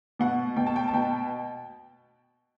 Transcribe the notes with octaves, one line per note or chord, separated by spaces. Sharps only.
B2 F#5
B2 G5
A5
G5
A5
B2 G5